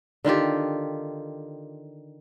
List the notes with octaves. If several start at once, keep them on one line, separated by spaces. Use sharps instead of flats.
D3 D#3 F4 G4